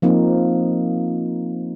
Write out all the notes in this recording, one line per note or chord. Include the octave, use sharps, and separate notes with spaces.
F3 A#3 C4 D#4